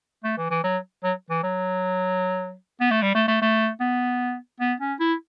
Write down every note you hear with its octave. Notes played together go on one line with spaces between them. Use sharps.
A3
E3
E3
F#3
F#3
E3
F#3
B3
A3
G3
A3
A3
A3
B3
B3
C#4
E4